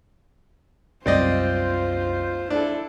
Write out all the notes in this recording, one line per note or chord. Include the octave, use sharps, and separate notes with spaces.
C2 F#2 C4 F4 C5 D5 D#5 G6
D4 E4 A4